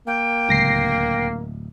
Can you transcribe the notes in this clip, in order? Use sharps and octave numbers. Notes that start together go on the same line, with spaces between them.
A#3 G5
D1 C#2 A#6 C7